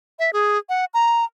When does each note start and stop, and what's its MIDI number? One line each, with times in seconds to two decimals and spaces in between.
0.19 0.30 76
0.33 0.58 68
0.69 0.85 78
0.94 1.24 82